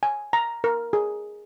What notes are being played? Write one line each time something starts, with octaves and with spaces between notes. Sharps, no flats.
G#5
A#5
A#4
G#4